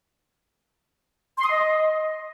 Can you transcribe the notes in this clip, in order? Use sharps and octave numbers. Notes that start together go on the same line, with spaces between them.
C6
D#6
D#5